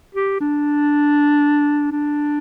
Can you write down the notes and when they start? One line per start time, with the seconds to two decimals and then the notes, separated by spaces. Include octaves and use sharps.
0.15 G4
0.40 D4
1.91 D4